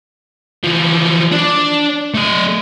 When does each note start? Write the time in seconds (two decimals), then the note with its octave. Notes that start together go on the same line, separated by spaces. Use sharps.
0.64 E3 F3
1.32 D4
2.14 A3 D#5